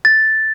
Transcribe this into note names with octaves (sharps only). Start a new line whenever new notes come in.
A6